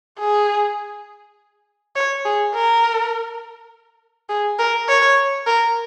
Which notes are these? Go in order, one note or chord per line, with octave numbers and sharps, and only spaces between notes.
G#4
C#5
G#4
A#4
G#4
A#4
C#5
A#4